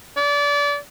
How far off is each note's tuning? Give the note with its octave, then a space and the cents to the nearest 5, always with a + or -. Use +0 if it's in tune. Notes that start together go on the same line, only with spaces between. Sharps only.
D5 -30